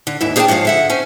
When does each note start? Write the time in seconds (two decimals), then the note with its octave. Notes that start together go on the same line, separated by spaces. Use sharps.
0.07 D3
0.21 D#2 G#2 E4
0.36 D4 G#4 C#5 F5 G5 A5
0.48 G#2 F3 C5 C#5 F5
0.65 D3 E5 F#5
0.90 C#4 C5 G#5